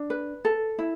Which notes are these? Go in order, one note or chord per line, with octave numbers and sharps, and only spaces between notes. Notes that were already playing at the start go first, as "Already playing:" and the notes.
Already playing: D4
B4
A4
E4